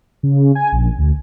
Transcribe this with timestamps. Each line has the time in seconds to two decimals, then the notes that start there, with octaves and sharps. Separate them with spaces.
0.23 C#3
0.55 G#5
0.72 A#1
0.98 D2